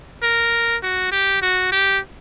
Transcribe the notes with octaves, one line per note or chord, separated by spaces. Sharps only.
A#4
F#4
G4
F#4
G4